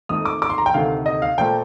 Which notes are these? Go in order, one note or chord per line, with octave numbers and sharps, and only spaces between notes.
F2 D#3 A3 D#6
D6
D6
C6
A#5
G5
D2 C3 D#3 A3 F5
D#5
F5
A#2 F3 A3 G5